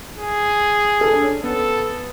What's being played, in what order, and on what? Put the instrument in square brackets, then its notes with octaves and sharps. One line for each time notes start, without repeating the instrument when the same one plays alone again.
[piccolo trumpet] G#4
[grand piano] A4
D4
C#4
[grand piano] B3 [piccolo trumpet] A4